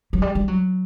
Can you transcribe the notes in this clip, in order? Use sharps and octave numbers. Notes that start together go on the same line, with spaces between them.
F#3
G3
G3
F#3